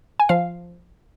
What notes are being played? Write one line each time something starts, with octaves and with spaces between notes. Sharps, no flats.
G#5
F3 F5